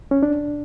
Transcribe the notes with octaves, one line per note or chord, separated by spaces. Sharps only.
C#4
D4